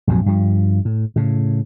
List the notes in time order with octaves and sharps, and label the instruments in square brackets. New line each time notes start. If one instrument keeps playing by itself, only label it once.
[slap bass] A#1 F2 G#2 F#3
G2 F3
A2
A2 C#3